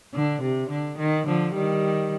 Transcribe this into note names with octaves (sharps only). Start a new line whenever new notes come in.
D3
C3
D3
D#3
D3 F3
D#3 G3